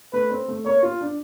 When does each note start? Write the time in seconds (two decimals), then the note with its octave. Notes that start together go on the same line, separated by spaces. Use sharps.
0.13 A3 B4
0.30 C4
0.48 A3
0.66 A#3 C#5
0.83 F4
1.01 D4